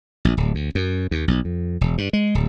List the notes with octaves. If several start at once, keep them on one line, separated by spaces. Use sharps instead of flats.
A#1
D1
D2
F#2
D#2
B1
F2
E1
G2
G#3
D1